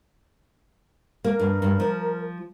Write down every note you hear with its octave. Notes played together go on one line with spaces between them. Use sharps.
A#3 A#4
G2
G2
F3